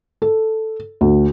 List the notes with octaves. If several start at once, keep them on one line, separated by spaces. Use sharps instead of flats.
A4
D2